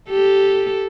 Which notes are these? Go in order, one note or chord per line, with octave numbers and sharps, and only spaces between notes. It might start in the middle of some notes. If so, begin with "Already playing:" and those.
G4 A4